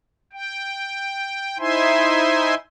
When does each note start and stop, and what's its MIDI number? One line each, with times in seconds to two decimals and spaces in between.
0.33 1.58 79
1.59 2.55 63
1.59 2.55 64
1.59 2.55 72
1.59 2.55 76
1.59 2.55 80
1.59 2.55 84